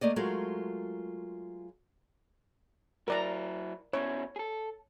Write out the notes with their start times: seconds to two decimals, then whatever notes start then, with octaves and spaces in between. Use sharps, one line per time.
0.01 A3 A#3 D5 D#5
0.16 F#3 G#3 A3 F4 A#4
3.08 F#3 E4 A#4 D5 A#5
3.93 B2 C#4 E4 C#5
4.36 G#4 A4